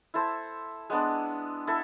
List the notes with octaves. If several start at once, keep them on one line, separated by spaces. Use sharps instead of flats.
E4 A4 C5
G#3 B3 D4
E4 A4